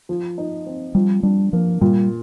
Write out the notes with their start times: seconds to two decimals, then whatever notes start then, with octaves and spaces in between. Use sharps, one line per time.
0.09 F3
0.38 D#4
0.66 C4
0.95 F3 G3
1.23 G3 D4
1.53 F3 A#3
1.81 A#2 G3